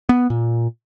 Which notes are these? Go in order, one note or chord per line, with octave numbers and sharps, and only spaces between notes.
B3
A#2